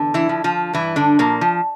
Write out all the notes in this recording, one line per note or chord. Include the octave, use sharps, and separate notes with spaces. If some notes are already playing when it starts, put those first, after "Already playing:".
Already playing: E2 D3
E3 E4
F3
F3 F4
G2 E3 E4
D3 D4
A#2 F3 A#3
F3